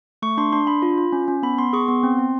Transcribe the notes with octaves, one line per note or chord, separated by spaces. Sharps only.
A3 C#6
D4 C6
D4 C6
D4 B5
F4
F4
C#4
C#4
B3 B5
B3 C6
G#4 C#6
B3 C6
C4
C4